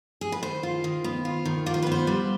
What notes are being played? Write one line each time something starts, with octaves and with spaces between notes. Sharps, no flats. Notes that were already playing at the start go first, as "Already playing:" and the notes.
G#4
B4
D#3 C5
F4
D#3
B3
F4
D#3
F4 D5
C5
B4
B3
C5
G3